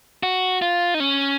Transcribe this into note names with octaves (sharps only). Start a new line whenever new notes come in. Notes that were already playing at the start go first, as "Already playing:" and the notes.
F#4
F4
D#4
C#4